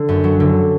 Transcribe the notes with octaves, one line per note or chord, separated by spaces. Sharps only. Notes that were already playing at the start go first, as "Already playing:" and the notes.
Already playing: D3
F#2
F#3
D3